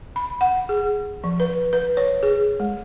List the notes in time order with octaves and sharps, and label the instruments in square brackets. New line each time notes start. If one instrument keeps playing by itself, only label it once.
[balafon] B5
F#5
G#4
F3
B4
B4
C#5
G#4
G#3